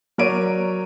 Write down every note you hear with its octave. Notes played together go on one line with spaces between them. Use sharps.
F#3 A#4 C#5 D5 D7 D#7